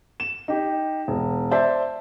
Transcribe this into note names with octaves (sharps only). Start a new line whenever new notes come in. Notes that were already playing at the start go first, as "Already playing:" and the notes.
E7
D#4 G4
E1
C5 D5 E5 A5 C6